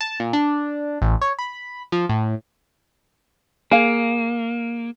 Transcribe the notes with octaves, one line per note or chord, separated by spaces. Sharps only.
A5
A#2
D4
A1
C#5
B5
F3
A2
A#3 G#4 F5